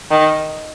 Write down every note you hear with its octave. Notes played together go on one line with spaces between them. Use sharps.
D#3